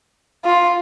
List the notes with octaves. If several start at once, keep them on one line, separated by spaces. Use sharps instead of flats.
F4